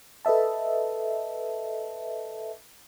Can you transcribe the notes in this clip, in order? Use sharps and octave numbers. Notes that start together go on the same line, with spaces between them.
A4 B4 D#5 E5 A5